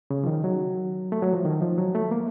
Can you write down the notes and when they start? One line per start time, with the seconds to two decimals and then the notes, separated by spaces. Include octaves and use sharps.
0.10 C#3
0.24 F3
0.27 D#3
0.44 F#3
1.12 A3
1.22 F#3
1.33 F3
1.45 D#3
1.62 F3
1.78 F#3
1.95 A3
2.11 A#3